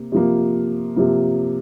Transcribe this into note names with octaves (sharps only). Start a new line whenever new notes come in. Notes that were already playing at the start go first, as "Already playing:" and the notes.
Already playing: C3 A#3
C3 F3 A#3
C3 F3 A#3